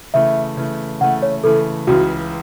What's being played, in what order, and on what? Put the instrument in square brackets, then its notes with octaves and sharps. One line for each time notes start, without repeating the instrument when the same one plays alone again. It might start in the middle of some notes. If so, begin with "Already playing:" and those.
[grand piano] C#3 E3 A3 [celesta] E5
[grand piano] C#3 E3 A3
[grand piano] C#3 E3 A3 [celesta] F#5
[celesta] C#5
[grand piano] C#3 E3 A3 [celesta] A4
[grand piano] C#2 C#3 E3 [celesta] F#4